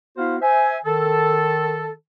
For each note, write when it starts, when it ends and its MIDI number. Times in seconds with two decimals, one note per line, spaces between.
0.17 0.36 59
0.17 0.36 64
0.17 0.36 66
0.17 0.36 72
0.17 0.36 77
0.41 0.78 72
0.41 0.78 76
0.41 0.78 80
0.84 1.91 51
0.84 1.91 69